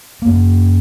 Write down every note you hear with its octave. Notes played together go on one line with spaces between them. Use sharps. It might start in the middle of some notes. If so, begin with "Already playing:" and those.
F#2 A#3